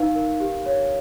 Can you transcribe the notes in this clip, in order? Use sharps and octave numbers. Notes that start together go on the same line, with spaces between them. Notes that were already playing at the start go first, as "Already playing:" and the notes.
Already playing: D#4 B4 F5
A#4
G4
C#5